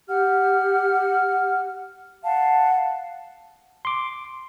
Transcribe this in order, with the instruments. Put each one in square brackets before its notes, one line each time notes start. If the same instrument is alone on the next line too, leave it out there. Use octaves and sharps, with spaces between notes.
[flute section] G4 F#5 F6
F5 F#5 A5
[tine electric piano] C6 D6